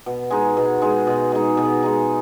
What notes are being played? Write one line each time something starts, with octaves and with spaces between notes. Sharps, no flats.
B2
G#3 D#4
B2
G#3 D#4
B2
G#3 D#4
B2
G#3 D#4